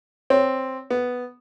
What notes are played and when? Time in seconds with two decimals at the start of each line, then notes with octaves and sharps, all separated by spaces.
0.30 C4 C#5
0.90 B3